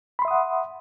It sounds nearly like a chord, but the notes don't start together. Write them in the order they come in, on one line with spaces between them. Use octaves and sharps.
B5 C6 E5 D#6 F#5